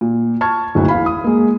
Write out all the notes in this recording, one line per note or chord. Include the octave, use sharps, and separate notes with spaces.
A#2
A5 C#6 F6 G#6
F#1 D2 A2 D#4 F#4
E2 F5 B5
D#6
G#3 A#3